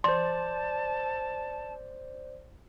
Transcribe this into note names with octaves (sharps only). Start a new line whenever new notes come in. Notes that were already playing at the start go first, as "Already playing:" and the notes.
C5 D5 A5 C6